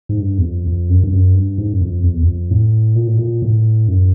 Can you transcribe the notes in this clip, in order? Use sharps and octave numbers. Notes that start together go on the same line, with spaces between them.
G#2
G2
E2
F2
F2
F#2
G2
F#2
G2
G#2
F#2
F2
F2
E2
F2
A2
A#2
A2
A#2
A2
F#2